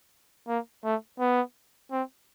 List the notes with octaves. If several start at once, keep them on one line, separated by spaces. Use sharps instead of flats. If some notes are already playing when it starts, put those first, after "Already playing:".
A#3
A3
B3
C4